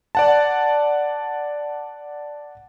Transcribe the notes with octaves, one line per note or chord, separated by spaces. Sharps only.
D5 F#5 A5